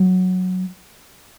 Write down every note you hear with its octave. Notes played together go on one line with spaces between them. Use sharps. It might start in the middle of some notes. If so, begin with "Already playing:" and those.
Already playing: F#3